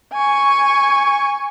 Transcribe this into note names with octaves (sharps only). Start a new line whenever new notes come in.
G#5 C#6